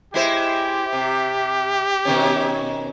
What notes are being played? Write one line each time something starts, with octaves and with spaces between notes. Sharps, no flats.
G#3 E4 G4 C5
C3
B2 D#3 C#4